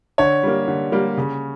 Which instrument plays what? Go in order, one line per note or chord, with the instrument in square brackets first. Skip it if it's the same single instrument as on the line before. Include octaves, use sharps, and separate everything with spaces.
[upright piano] D3 [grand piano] C#5
[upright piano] G3 A#3
D3
G3 A#3
C#3